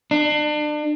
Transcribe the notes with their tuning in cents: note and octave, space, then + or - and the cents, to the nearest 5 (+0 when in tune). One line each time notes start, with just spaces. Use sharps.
D4 +35